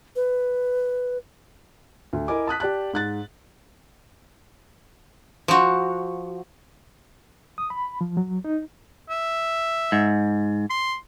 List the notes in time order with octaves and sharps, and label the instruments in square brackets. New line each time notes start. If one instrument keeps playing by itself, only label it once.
[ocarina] B4
[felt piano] D2
E4 A#4 D#5 G#5 D6
A5 D#6 F#6 B6
G4 D5 A5 F#6
G#2 F#6 A6
[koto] F3 F#4
[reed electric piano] D#6
B5
F3
F#3
D#4
[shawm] E5
[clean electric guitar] G#2
[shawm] C6